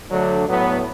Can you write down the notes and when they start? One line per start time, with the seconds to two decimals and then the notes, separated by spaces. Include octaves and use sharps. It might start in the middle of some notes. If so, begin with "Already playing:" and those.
0.10 D3 F#3 A3 D4
0.47 A2 F#3 B3